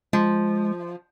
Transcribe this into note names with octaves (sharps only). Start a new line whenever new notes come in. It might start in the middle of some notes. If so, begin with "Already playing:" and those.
F3 G#3